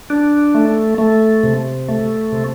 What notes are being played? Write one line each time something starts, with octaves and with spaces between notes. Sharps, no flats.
D4
A3
A3
C3
A3
C3